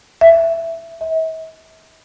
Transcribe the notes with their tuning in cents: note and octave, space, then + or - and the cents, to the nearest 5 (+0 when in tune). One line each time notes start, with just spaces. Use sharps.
E5 +10
E5 -45